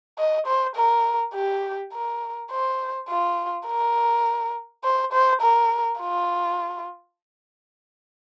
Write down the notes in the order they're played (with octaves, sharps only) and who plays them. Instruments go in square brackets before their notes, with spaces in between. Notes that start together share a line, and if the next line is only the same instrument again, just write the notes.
[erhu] D#5
C5
A#4
G4
A#4
C5
F4
A#4
C5
C5
A#4
F4